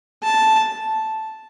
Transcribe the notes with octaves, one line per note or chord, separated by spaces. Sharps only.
A5